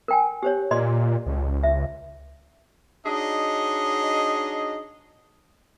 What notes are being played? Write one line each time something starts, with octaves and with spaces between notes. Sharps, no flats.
A#4 G5 G#5
G4 C5 C#5
A#2 D5 D#5 C6
C#2
E5
D4 D#4 F#4 G#4 C#5 D#5